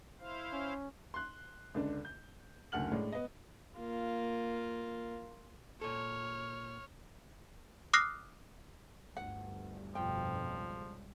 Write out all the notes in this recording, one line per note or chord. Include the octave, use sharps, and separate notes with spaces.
E4 C5 F5
C#4
C6 F#6
C#2 D3 D4
G6
F#1 D2 F#5 F6 F#7
A2 G#3 D4
B3 D#5
A#3 F4
A#2 A4 C#5 F6
D6 D#6 F6 F#6 A#6 C7
G1 D2 G2 F#5
F2 B2 F3 G5
C#2 C#3 G3